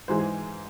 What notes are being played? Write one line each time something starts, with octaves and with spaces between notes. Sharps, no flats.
G#2 E3 G#3 C5
G#4